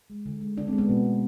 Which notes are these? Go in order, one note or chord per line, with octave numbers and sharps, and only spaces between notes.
G#3
D3
G#3
D3 D4
C4
G#3
B3
B2
A3